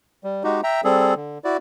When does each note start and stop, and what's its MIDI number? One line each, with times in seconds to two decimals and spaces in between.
0.24 0.43 55
0.44 0.61 56
0.44 0.61 63
0.44 0.61 66
0.44 0.61 67
0.63 0.81 76
0.63 0.81 79
0.63 0.81 82
0.84 1.14 55
0.84 1.14 60
0.84 1.14 68
0.84 1.14 69
1.16 1.38 50
1.44 1.57 64
1.44 1.57 66
1.44 1.57 74